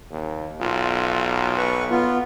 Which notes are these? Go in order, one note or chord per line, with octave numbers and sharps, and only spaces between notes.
D#2
B1 F4
B4 C#6
B3 F4